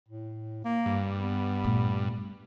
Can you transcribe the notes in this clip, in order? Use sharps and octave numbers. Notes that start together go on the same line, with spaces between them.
A2
A#3
G2
B3
A#2 A3